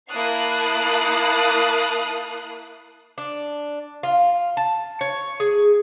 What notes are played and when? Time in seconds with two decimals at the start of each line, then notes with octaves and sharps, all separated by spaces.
0.10 A#3 E4 A5 D#6 F#6 C7
3.18 D4
4.03 F4
4.57 A5
5.01 C#5
5.40 G#4